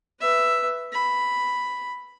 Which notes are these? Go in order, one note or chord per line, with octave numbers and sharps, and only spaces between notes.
B4 E5
B5